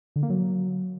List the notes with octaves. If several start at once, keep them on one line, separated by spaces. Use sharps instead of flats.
D3
A#3
F#3